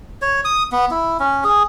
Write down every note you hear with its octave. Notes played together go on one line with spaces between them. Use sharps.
C#5
D#6
B3
E4
C#4
G#4